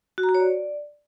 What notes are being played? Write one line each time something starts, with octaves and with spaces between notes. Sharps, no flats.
F#4
A#5
F#4
C#5
D5